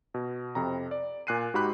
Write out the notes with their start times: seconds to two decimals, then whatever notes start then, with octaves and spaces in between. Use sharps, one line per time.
0.14 B2
0.55 F2 C3 A#5
0.91 D5
1.27 A#2 G#5 F#6 C7 D#7
1.54 G#2 F#4 G4 B5 F#6